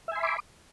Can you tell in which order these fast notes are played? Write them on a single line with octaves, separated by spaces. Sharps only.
E5 G#5 C6 B5 D6